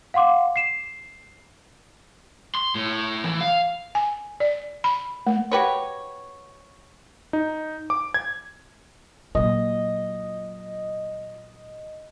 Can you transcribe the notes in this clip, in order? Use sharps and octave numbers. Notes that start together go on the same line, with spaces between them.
F5 F#5 C6 D6
C7 E7
C6
A2
E3
F5
G#5
D5
B5
A3
F#4 G4 B4 C#5
D#4
D6
G#6
A#2 F#3 D#5